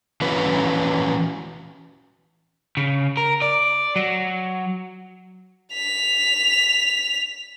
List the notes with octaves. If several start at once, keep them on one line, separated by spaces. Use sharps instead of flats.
E3 C#4 F#4 B4
C#3
A#4
D5
F#3
B6 F7